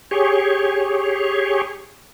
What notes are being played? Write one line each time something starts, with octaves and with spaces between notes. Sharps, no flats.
G4 G#4 C#5